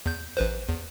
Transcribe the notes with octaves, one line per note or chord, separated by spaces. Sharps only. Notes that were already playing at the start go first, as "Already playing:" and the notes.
E2 G6
A1 B4 C5
E2